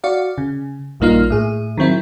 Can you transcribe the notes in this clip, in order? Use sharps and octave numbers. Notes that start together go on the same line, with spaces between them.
F#4 D5 F5
C#3
A#1 G2 A#3 D#4 F4 F6
A2 G#4
D#3 F#3 C4 E4